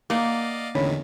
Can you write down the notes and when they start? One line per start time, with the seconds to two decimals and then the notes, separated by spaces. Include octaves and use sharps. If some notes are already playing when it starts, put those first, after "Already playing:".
0.10 A#3 D5 D#5 F5 F#5
0.75 E2 A2 D3 D#3 C#4 B5